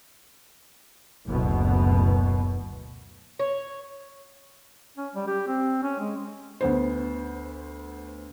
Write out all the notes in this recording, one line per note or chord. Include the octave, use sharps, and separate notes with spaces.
F#1 D2 B2
C#5
C#4
G3
G4
C4
C#4
G#3
D2 B3 C5